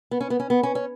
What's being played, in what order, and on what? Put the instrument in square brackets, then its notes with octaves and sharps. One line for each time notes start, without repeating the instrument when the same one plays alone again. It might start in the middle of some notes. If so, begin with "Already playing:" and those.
[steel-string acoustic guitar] B3
C#4
B3
C#4
B3
C#4
C#4